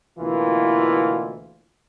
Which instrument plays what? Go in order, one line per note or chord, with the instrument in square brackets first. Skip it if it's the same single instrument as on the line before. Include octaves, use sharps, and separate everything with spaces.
[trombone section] D2 B2 E3 A#3 E4 F4